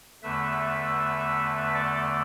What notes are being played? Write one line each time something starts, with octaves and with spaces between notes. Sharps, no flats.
E2 D3 A3 B4 E5
A4 D5